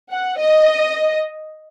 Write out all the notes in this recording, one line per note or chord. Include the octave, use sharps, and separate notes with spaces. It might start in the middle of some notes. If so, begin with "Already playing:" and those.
F#5
D#5